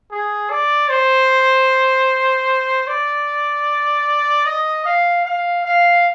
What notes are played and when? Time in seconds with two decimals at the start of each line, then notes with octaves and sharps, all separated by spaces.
0.11 G#4
0.50 D5
0.90 C5
2.87 D5
4.46 D#5
4.85 F5
5.25 F5
5.65 F5